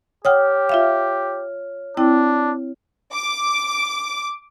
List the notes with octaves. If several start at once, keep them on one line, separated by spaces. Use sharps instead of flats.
G4 C#5 F#5 G5 D#6 F6
F4 E5 F5
C4 D4 E4 G5
D6